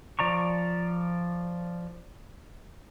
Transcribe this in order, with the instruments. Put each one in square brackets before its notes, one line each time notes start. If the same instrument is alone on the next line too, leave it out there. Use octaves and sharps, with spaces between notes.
[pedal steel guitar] F3 D5 A#5 C#6